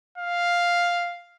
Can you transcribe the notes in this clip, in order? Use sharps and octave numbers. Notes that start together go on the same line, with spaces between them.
F5